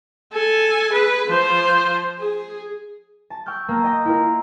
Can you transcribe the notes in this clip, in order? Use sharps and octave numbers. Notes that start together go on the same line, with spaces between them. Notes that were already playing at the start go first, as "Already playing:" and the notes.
A4 G#5
G#4 B4
F3 C5
G#4
A5
G5 C#6 E6 F6 G6
A#3 A5
D#5 G5 A#6
E4 F4 A#4